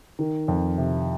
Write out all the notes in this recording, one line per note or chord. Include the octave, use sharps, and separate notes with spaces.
D#3
F2
C3